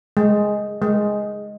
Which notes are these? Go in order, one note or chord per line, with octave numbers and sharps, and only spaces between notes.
G#3
G#3